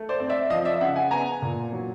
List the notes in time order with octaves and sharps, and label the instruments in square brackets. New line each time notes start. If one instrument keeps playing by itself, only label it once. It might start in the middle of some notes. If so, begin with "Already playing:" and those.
Already playing: [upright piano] A3
C5 D5
C4
D5 E5
F3 D#5 F5
D5 E5
C#3 E5 F#5
F#5 G#5
B3 G#5 A#5
A#2
F#3